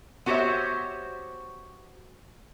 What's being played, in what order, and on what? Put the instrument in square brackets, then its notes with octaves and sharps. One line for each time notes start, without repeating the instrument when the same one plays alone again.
[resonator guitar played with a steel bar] B3 F#4 G4 C5 C#5 E5